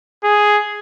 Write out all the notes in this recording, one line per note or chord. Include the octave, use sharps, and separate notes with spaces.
G#4